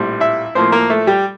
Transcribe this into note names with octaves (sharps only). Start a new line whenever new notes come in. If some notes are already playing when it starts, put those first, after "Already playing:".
Already playing: A#1 A2 G3 C4
E4 E5
A2 F3 A#3 C4 C5
A#3 A#4
A3 A4
G3 G4